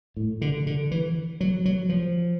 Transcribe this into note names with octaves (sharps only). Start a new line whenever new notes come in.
A2
D3
D3
E3
F#3
F#3
F3